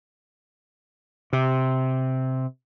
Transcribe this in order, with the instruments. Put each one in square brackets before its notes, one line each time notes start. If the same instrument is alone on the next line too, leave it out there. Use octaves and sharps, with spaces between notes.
[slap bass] C3